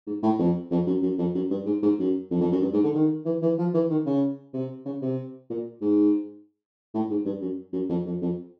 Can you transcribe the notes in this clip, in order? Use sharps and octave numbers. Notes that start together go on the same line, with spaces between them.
G#2
A2
F2
F2
F#2
F#2
F2
F#2
G2
G#2
G#2
F#2
F2
F2
F#2
G2
G#2
D3
D#3
E3
E3
F3
E3
D#3
C#3
C3
C#3
C3
A#2
G#2
A2
G#2
G2
F#2
F#2
F2
F2
F2